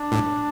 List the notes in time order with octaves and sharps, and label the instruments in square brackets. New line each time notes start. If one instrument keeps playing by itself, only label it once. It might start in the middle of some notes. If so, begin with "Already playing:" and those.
Already playing: [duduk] D4
[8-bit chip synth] A2